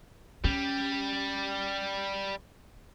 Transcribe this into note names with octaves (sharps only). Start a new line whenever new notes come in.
G3 C#4